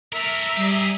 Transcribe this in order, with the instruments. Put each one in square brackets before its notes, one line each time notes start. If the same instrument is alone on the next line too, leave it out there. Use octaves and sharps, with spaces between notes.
[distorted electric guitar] A3 A#4 [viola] E5 A#5
[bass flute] G3 [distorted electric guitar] G4 G#4